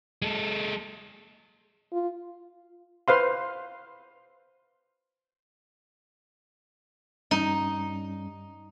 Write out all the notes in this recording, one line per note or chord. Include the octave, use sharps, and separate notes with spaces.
G#3 A4
F4
B4 C5 F5 C6
G2 G3 C#4 D#4